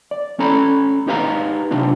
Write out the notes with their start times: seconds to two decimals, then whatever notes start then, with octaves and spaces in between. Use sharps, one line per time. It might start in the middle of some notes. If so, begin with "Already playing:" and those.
0.11 D5
0.39 C#4 A4 A#5 B5
1.07 D#4 G4 B4 F5 G#5 A#5
1.71 C3 D4 F4